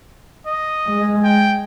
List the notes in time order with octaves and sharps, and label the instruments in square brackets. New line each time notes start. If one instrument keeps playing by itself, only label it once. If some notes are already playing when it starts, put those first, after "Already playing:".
[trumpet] D#5
[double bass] G#3
[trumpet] G5